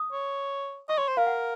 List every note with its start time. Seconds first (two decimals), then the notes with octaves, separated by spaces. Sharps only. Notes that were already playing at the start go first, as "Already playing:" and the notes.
Already playing: D#6
0.12 C#5
0.89 D#5 C#6
0.98 C#5 C6
1.08 C5
1.17 A#4 F5
1.27 F#5